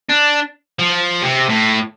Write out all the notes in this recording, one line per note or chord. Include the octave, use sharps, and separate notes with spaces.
D4
F3
C3
A2